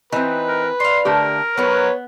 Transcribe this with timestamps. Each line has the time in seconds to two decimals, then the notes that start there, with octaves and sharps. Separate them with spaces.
0.12 E3 C4 D#4 B4
0.48 A#4
0.80 D4 F5 C6
1.05 D3 A3 G4 A#4
1.57 F#3 B3 D#4 B4 C#5